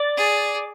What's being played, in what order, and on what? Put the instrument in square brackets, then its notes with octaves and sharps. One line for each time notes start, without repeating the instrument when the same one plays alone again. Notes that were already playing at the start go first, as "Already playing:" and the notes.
Already playing: [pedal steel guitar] D5
[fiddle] G#4